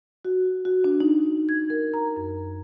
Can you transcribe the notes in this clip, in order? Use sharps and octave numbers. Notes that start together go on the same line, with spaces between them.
F#4
F#4
D4
D#4
G#6
A#4
A#5
F#2